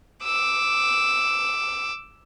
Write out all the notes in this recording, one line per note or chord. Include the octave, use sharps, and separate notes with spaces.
D6 E6